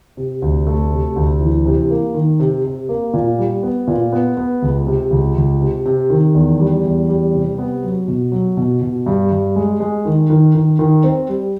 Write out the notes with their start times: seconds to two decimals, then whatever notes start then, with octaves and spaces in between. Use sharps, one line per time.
0.17 C3
0.42 D2
0.67 A3
0.92 C3
1.16 D2
1.41 E3
1.66 C3
1.90 A#3
2.15 D#3
2.40 C3
2.64 C3
2.89 A#3
3.14 A#2
3.39 G3
3.63 B3
3.87 A#2
4.12 B3
4.37 B3
4.62 C#2
4.87 C3
5.11 C#2
5.36 C#2
5.61 C3
5.86 C3
6.10 D#3
6.35 E2
6.59 G3
6.84 E2
7.09 G3
7.33 C3
7.58 B3
7.83 F#3
8.08 B2
8.32 F#3
8.57 B2
8.82 B2
9.06 G2
9.31 G2
9.56 G#3
9.80 G#3
10.05 D#3
10.30 D#3
10.55 D#3
10.79 D#3
11.04 C4
11.28 G3